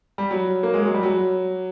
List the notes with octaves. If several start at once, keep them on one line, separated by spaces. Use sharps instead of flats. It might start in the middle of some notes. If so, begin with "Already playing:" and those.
G3
F#3
A#3
G#3
F#3
G3
F#3